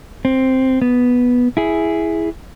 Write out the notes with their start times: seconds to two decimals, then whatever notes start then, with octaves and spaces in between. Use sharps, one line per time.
0.25 C4
0.82 B3
1.57 E4 G#4